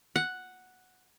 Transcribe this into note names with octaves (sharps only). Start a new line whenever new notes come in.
F#5